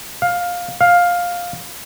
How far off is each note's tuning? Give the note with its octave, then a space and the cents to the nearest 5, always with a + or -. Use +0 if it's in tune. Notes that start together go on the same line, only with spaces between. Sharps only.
F5 +15
F5 +10